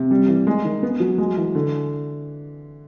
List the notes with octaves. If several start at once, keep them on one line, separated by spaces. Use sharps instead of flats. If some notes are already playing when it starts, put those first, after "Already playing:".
Already playing: C3
G3
E3
G#3
D#3
B3
F#3
G#3
E3
D3